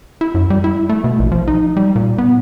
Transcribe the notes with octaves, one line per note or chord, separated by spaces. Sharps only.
E4
F#2
G3
E4
A3
B2
A#1
F3
D#4
G3
A#2
B3